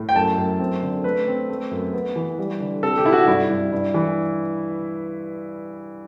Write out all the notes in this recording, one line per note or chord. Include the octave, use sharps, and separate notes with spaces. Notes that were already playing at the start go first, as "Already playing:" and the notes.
Already playing: A2
G5
F#2 A5
F#2
C4
D3
A3 B4
C4
A3
F#2
B3
E3
G3
D3
C3 A4
G4
C3 E4
F#4
G2 E4
G2
G2
E3